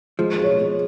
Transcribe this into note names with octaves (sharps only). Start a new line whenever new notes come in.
F3 G#3
F4 C#5
G#3